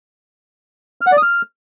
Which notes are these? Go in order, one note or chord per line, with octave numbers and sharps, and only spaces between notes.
F6
F#5
D5
D#6
F6